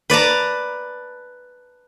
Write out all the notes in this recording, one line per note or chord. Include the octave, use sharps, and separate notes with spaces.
B4 D5 A5 A#5